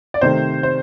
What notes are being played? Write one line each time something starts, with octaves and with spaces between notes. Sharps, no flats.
D5
C3 D#3 A3 C5
C5